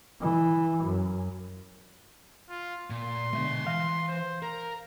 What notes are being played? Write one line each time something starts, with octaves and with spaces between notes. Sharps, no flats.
E3
F#2
F4
A#2 C6
B2 D3 G#3 E5
E3 F5
C5
A#4 A#5